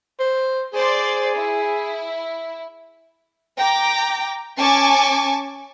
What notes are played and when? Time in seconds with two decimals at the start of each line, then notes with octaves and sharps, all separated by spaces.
0.19 C5
0.74 G#4 C5 D5 C6
1.35 E4
3.58 G5 A#5 D6
4.57 C#4 G#5 A5 C#6 D6